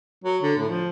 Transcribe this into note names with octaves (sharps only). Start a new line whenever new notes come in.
F#3
D3
A2
F3